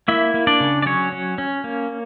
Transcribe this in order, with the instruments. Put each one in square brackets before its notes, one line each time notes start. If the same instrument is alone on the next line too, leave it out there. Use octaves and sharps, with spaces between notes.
[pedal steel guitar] A#3 E4 E5
A#3
D4 D5
C#3
D5
F#3 C#4 C#5
C#4
C#4
A#3